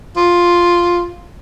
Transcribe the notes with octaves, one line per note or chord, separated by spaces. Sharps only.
F4